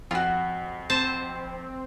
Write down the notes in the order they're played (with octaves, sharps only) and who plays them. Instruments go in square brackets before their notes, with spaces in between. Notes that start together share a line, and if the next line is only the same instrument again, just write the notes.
[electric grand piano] F2 [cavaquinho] F4 F#4
[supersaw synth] C4 [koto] C5 A5